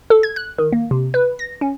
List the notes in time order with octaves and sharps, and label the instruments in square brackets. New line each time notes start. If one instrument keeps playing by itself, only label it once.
[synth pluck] A4
G#6
F#6
D#3
A#3
C3
B4
A#6
C#4